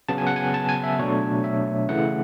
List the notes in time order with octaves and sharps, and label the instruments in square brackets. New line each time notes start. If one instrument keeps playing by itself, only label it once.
[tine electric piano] C#3 F#3 B3 A5
G#5
F#5
G#5
A5
G#5
E5
B2 F#3 A3 D4 C#5
E5
C#3 E3 A3 E4 F#5